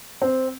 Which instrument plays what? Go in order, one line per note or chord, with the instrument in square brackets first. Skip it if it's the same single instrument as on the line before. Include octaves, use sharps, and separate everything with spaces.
[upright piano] C4